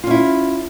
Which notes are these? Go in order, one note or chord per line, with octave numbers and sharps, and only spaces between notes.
C#4 E4 F4